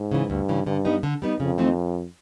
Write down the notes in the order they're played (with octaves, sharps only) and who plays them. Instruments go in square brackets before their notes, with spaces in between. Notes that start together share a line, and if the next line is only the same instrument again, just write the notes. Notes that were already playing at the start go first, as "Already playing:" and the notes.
Already playing: [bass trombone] G#2
[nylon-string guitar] C#3 E3
[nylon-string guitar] D2 [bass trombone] G2
[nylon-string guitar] C#3 E3
[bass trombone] G2 [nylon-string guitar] D3
[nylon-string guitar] G3 B3 D#4
D3
G3 B3 D#4
[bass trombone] F2 [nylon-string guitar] C#3
[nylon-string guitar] E3 A3 C4 D#4